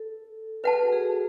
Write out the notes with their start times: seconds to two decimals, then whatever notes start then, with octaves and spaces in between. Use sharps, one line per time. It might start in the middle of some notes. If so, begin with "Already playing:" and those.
Already playing: A4
0.64 A4 B4 F#5 A5
0.73 G#4
0.82 F#4
0.93 G#4
1.05 F#4